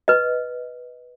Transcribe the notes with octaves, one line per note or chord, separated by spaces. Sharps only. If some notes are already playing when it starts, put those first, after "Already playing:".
B4 D#5